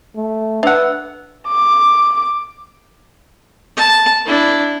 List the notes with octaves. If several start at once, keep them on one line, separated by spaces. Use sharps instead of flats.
A3
D4 B4 E5 F#5 E6 F#6
D6
A5
D4 E4